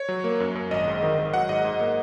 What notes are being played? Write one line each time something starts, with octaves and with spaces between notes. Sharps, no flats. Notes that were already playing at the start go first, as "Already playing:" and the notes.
Already playing: C#5
F#3
A#3
F#2
F#2
G#1 D#5
G#2
D#3
D#3
F#3 F#5
G#2 D#5
G#2
A#3